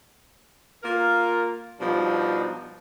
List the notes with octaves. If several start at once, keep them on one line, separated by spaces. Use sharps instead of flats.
A#3 F4 A#4
B2 F3 G3 D4 D#4